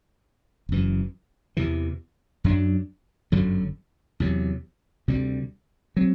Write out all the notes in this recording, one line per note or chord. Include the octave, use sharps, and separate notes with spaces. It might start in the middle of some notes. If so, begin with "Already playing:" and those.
F#1 F#2 E3
E2 C3 E3
F#2 F#3 B3 D4
G1 F#2 D3 F#3
E2 C3 F#3
D2 C3 G3
F#3 C4